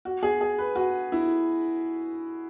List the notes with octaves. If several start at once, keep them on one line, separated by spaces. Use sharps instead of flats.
F#4
G#4
G#4
B4
F#4
E4